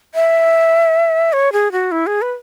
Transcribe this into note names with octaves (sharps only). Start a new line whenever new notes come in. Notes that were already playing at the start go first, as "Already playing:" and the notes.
E5
C#5
G#4
F#4
E4
G#4
B4